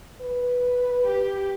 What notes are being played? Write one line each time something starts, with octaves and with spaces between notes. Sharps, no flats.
B4
G4